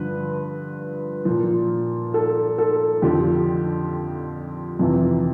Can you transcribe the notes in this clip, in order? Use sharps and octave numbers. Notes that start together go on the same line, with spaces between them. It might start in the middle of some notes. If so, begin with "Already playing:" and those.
Already playing: G2 D3 F3 B4
A#2 F3
A4
A4
F2 D3 F3 G4
F2 C3 E3